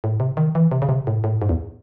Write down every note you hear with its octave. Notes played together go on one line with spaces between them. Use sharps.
A2
C3
D#3
E3
C3
C#3
C3
A2
A2
G#2
E2